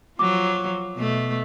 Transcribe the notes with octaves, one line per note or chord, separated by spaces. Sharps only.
F3 F#3 D6
B2 A3